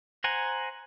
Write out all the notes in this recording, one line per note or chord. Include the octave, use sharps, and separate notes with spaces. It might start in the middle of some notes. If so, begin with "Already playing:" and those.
C5 F#5 G#5 A#5